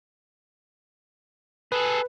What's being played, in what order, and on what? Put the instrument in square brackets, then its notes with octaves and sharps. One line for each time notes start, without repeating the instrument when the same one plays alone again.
[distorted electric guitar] G#4 A4 [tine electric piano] B4